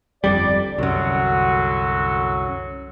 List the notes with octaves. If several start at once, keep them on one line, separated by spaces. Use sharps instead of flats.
G1 F2 G3 D5
C2 F#2 D3 F#3 F#4